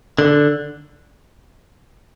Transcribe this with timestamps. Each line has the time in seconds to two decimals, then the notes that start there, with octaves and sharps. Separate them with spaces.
0.19 D3